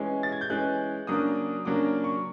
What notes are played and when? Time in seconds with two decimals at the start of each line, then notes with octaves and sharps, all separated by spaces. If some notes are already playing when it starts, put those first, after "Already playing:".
Already playing: E3 G#3 C#4
0.23 A6
0.32 G#6
0.41 G6
0.50 E3 G#3 C#4 F#6
1.07 C#3 F#3 A#3 D4 D#6
1.65 C#3 F#3 A#3 D4 D6
2.04 C#6